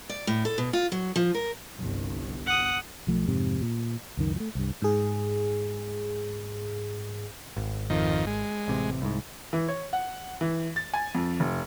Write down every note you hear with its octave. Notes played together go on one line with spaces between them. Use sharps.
D5
A2
A4
B2
F4
F#3
F3
A#4
G1 C2 G2
F#5 D#6
B1 F3 A3
F2 G#2 C3
A#2
C#2 F#2 D#3
F3 A3
C2 G2
G#2 G#4
G#1
F2 D#3
G#3
A1 C3
C2 G#2
E3
C#5
F#5
E3
A6
G#5
F2
F1